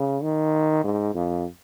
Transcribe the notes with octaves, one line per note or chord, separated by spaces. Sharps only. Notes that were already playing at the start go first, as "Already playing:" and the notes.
Already playing: C#3
D#3
G#2
F2